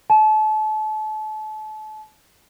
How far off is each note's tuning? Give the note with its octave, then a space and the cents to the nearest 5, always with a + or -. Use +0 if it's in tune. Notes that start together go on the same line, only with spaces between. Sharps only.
A5 -35